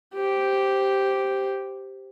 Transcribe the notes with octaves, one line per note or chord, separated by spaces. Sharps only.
G4 C5